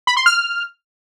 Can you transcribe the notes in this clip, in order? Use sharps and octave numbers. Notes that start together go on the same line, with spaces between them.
B5
C6
F6